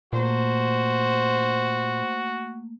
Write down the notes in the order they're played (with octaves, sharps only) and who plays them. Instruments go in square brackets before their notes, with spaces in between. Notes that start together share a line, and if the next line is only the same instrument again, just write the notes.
[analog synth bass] A#2 [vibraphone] A3 A#3 [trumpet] F#4 [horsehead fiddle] C5